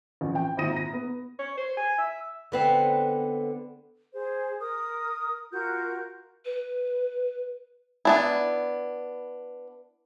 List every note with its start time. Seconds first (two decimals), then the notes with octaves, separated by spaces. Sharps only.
0.21 A1 F2
0.35 G5
0.57 G#1 A#2 E4 D#6 A#6 D#7
0.72 A#5 A#6
0.93 B3
1.39 C#5
1.57 C5
1.77 G#5
1.98 E5
2.52 D3 B3 C4
4.14 G#4 C5
4.59 A#4 D#6
5.52 F4 F#4 A#4 G6
6.45 B4
8.05 B3 D4 E4